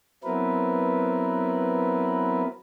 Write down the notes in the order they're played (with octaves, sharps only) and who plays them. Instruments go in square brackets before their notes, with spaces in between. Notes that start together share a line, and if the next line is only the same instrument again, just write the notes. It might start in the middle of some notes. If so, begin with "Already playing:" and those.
[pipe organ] F#3 B3 C4 E4 A#4 B4